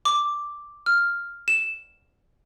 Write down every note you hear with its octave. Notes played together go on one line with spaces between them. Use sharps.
D6
F6
E7